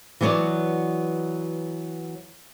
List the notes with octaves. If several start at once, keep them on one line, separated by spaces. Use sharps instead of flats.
E3 F#3 B3 F#4 C#5 D5